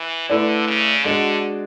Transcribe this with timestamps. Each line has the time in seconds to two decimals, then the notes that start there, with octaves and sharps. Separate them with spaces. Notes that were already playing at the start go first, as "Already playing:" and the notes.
Already playing: E3
0.29 D3 A3 E4 B4 D5
0.68 C#3
1.05 D3 G#3 D4 F#4